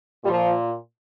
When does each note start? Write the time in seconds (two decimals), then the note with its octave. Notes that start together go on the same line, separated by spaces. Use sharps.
0.24 A#2 F3 G3